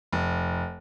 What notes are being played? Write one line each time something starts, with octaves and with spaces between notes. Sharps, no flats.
F1